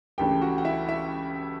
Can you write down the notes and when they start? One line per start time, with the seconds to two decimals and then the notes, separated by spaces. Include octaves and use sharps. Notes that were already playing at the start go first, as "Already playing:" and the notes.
0.18 C#2 C#3 E3 A3 D4 G4 G5
0.41 F#4 F#5
0.58 F#5
0.65 E4 E5
0.88 E4 E5